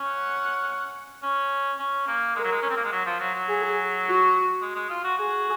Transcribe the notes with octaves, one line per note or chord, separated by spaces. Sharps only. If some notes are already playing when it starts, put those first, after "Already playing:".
Already playing: C#4
F#5
C#4
C#4
A#3
G#3 A#4
F#3
G#3
C#4
C4
A#3
G#3
F#3
F3
F#3
F#3
G#4
F#4
G#3
G#3
F4
F#4
F#4 G#4